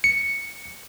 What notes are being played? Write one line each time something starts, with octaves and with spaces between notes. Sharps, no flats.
C#7